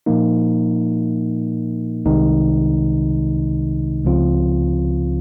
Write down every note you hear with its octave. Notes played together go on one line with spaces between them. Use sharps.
A#2 F3 A#3 D#4
C2 C3 D#3 G#3 D#4
C#2 C#3 F3 C4 F4